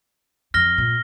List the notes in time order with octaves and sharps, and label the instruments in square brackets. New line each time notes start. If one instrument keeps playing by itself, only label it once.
[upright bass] F2 [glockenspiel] F6 A#6 G7
[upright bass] A#2